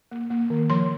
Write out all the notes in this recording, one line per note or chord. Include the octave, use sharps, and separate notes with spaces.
A#3
A#3
D#3
F3 C6